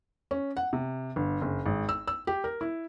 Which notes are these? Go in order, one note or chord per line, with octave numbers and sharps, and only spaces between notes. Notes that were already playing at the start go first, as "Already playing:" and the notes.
C#4
F#5
C3
G1
F#1
G#1
E6
E6
G4
A#4
E4